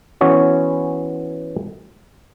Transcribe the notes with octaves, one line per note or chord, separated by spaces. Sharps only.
E3 B3 C#4 F#4 C#5